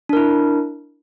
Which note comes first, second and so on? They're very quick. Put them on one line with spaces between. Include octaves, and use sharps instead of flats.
D4 A#4 E4